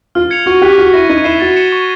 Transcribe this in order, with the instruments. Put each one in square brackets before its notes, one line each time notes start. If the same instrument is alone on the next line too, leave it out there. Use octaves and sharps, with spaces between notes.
[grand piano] F4 [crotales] F6
[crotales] G#6 C#7 F7
[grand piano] F#4 [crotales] C#6
[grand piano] G4 [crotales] F#6 B6
[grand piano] F#4 [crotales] F6
[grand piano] E4 [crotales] A#6 D#7
[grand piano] D#4 [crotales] G#6
[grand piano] E4 [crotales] C7 E7 G7
[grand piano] F#4 [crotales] A6
[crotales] C#7 E7 G7
C#6